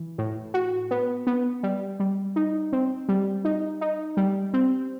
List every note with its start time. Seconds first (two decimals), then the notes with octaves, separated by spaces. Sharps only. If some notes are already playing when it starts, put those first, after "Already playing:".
Already playing: E3
0.18 A2
0.54 F#4
0.91 B3
1.27 B3
1.63 G3
2.00 G3
2.36 D#4
2.73 C4
3.09 G3
3.45 D#4
3.81 D#4
4.17 G3
4.54 C4